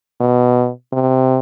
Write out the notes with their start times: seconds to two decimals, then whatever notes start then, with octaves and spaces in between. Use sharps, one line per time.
0.20 B2
0.93 C3